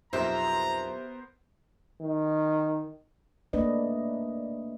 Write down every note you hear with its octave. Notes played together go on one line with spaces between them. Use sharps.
B1 F2 B3 G4 A#4 C5 E5 A#5
D#3
A3 A#3 D4 B4 D5 D#5